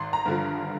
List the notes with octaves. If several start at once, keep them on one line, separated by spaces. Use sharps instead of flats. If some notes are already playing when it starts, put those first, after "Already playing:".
Already playing: G#1 C6
A#5
G2 D3 F3